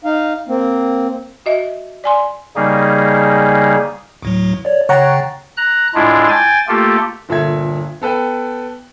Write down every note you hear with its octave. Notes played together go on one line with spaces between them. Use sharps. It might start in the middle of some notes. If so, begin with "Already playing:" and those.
D#4 F5
A#3 C4
F#4 D#5 E5
D5 G#5 C6
C#3 G3 A#3 D#4 G#4
D2 A2 F#3
C#5 D5
C#3 C#5 F#5 G5 A#5 A6
A#5 F#6
A2 G#3 D4 E4 F4
G5 G#5 A6
A3 A#3 F4 G4 A4
G1 A#2 A4 E5 G#6
B3 A4 B4 G5